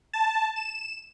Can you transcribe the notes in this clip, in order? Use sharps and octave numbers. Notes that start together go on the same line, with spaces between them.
A5
E7